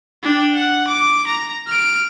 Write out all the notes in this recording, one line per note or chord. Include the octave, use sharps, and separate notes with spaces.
D4 G5
F#5
D6
A#5
F6 D7